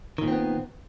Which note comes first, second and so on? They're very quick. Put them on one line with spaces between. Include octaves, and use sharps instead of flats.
D#3 A#2 C4 B3